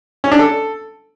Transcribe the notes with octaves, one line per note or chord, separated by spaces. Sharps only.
C#4
D4
A4